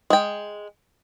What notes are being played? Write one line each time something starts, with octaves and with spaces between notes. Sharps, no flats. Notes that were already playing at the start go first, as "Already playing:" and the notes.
G#3 G5